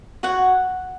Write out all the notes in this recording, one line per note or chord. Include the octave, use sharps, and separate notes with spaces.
F#4 C#5 F#5